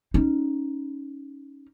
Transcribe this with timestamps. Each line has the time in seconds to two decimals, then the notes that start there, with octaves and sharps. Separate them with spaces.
0.14 C#4 D#4